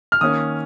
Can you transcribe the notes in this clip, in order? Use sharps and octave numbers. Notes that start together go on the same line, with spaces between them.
F6
D#3 A#3 C#4 D#6